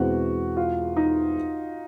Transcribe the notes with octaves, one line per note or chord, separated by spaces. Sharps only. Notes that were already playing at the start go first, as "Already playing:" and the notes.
Already playing: E2 B2 G#3 C4 F#4
F4
D#4